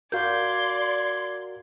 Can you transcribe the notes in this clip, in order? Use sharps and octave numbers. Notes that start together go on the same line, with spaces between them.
F#4 A#4 D5 F5 C6 G6 G#6